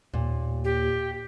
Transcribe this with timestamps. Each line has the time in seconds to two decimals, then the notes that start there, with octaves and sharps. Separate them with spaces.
0.13 D#2 A#2
0.64 G4